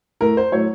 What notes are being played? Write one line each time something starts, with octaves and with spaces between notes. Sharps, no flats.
A2 A3 A#4
C5
A2 F#3 A3 C#5